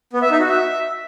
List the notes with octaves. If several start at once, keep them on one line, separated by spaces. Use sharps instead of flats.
B3
E5
D#4
F#4
E5